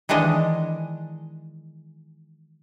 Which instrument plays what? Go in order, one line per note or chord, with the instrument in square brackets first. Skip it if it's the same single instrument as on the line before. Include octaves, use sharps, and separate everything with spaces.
[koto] D#3 E3 G#3 D4 D#5